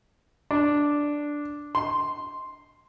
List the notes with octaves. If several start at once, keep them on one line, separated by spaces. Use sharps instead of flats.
D4
C6